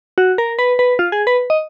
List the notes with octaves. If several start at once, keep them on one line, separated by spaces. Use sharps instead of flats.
F#4
A#4
B4
B4
F4
G#4
B4
D#5